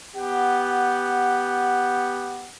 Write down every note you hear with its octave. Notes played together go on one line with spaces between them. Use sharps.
B3 G4 F#5